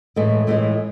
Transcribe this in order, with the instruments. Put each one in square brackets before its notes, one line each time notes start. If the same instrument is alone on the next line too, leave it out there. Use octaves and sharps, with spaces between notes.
[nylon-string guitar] A2 E3 G#3
A2 E3 G#3